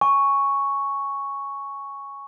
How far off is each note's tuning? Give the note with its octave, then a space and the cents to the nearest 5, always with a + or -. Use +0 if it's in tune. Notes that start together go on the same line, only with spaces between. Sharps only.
G#5 +0 C#6 +0